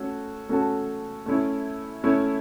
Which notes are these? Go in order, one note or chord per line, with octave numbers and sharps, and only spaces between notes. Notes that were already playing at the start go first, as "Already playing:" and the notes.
Already playing: A3 C#4 F#4 A4
A3 C#4 F#4 A4
A3 C#4 E4
A3 C#4 E4